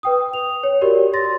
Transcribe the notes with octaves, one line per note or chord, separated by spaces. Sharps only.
B4 G5 D#6
F7
C#5
F#4 G4 A#4 D5
C6 A6 A#6